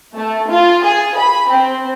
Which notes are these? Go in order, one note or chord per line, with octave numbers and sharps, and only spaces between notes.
A3
F4
G#4
B5
C4